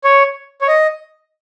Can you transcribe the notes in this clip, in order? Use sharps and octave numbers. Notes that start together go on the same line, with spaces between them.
C#5
C#5
D#5